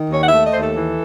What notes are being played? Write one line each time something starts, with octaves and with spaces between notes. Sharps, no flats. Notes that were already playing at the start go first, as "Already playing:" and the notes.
Already playing: D#3
D#2 C#5
F#5
E5
A3
D#5
D#2 C5
A4
E3